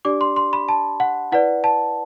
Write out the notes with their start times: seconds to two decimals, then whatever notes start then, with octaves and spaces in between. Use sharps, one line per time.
0.05 D4 G4 D5 D6
0.21 C6
0.36 C6
0.53 B5
0.69 A5
1.00 F#5
1.32 E4 B4 D5 F#5
1.64 A5